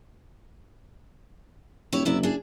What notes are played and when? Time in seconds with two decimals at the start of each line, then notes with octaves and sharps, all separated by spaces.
1.93 D#1 E4 G4 C#5
2.05 F#1 C3 E4 D5
2.23 D4 G#4